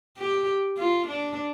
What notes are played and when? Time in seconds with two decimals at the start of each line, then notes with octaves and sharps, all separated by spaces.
0.18 G4
0.78 F4
1.08 D4